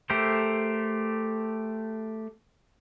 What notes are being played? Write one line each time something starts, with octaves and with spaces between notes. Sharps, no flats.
A3 G4 A4 A#4 C5